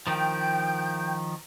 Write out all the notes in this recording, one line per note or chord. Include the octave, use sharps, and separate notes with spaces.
D#3 F3 G5 G6